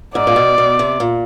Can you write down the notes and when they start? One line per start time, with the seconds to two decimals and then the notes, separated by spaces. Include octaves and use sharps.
0.15 G#2 D5
0.27 A#2
0.36 B2
0.58 B2
0.79 C3
1.00 A#2